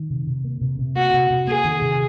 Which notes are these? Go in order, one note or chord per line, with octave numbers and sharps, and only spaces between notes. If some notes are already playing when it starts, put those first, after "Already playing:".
Already playing: D#3
C3
C3
A#3
C3
C3
A#3 F#4
C3
C3
A#3 G#4
D#3
C3